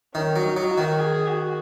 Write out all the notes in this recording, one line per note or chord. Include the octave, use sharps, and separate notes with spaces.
D#3 C#4
F#3
D#4
F#3
F#4
D#3
G#4
F#4